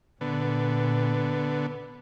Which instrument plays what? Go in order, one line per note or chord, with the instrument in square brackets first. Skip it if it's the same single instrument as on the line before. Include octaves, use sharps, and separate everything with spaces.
[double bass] A#2 [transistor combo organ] D3 B3